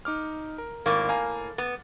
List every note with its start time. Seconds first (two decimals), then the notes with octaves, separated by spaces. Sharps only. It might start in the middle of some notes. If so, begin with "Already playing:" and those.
0.05 D#4 D6 F6
0.58 A#4
0.86 G#1 A2 A#3 C#6 A6
1.09 F5 G#5 A#5
1.58 B3 A6